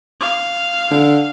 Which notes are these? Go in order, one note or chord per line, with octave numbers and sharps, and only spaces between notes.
F5
D3